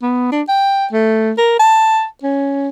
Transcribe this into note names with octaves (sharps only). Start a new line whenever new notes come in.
B3
D4
G5
A3
A#4
A5
C#4